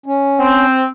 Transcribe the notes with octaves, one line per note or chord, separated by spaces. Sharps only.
C#4
C4